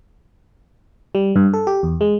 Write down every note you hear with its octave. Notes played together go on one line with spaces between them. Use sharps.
G3
G2
A4
G4
E2
G#3